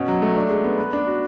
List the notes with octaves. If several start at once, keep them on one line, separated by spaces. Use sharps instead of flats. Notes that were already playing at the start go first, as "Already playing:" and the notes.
Already playing: B2 C#4
F#3
A3
D4
G#3
B3
B4
D4
F#4